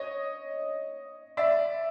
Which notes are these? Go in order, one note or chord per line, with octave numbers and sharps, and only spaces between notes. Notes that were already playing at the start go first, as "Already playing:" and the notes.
Already playing: C#5 D#5
D5 E5